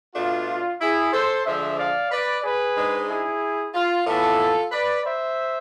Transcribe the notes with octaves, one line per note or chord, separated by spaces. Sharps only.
B2 A3 D4 F4
E4 G#4
A4 C5
D3 F3 G#3 D4 C5 E5
D5 F5
B4 D5
G#4 B4
G#2 G#3 D4
E4 G#4
F4
A2 E3 B3 F4 A4
B4 D5
C5 E5